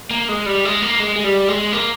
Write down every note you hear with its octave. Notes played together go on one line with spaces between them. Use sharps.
A#3
G#3
G3
G#3
A#3
G#3
G#3
G3
G#3
A#3